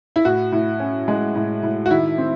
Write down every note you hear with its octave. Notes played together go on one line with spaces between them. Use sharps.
E4
A2 F#4
A2
C#4
G#3
A2
A2
F#4
D#3 E4
C4